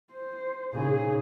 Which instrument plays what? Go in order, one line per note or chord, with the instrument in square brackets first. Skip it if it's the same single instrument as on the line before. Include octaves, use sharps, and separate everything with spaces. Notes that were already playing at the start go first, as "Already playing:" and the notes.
[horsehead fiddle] C5
[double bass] A#2 C#3 [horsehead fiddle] D#4 G#4